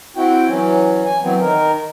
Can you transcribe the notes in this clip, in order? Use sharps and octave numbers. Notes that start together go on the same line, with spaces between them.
C4 E4 F#4 G5
E3 F#3 C#4
G#5
E3 F#3 B3 C4
D#3 A#4